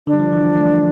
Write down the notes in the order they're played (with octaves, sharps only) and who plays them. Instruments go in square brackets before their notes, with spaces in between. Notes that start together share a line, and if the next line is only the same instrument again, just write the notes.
[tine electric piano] D3 [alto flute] D4
[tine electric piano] G3
F3
E3
F3
A3